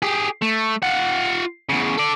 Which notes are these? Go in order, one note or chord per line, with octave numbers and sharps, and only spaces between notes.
G4 G#4
A3
F4 F#5
E2 C#3
A4 D5